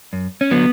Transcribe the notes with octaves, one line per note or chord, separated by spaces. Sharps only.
F#2
C#4
D3 F#3 B3